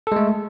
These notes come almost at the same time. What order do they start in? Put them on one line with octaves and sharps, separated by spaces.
A4 G#3 A3